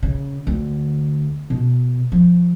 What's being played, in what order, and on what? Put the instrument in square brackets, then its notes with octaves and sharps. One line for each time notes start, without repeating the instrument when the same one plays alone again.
[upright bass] C#3
D2
B2
F3